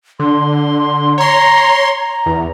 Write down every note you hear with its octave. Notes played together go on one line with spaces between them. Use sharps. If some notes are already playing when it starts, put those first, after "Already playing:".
D3 C6
C#5 A#5 C6
A#5
E2